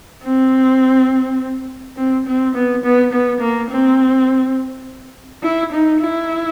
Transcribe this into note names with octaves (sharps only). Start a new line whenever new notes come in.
C4
C4
C4
B3
B3
B3
A#3
C4
E4
D#4
E4